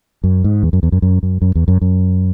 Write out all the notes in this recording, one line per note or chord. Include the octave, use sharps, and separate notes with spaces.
F#2
G#2
E2
F#2
E2
F#2
F#2
F#2
F#2
E2
F#2
F#2